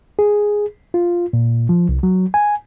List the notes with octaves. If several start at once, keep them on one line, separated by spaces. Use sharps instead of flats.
G#4
F4
A#2
F3
C2
F#3
G#5